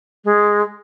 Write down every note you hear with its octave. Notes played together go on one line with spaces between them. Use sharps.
G#3